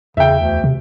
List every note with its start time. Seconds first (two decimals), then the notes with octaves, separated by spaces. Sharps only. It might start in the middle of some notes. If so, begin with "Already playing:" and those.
0.17 E2 C#3 E5 G5
0.40 D2
0.64 C3